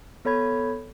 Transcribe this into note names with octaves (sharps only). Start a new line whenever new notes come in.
B3 A4 C#5 B5 G#6